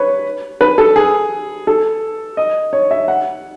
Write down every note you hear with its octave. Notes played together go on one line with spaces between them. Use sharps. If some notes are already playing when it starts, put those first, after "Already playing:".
Already playing: B4 C#5
B4
A4
G#4
A4
D#5
C#5
E5
F#5